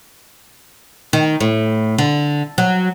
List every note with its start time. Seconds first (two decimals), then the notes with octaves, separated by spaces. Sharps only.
1.13 D#3
1.41 A2
1.98 D3
2.58 F#3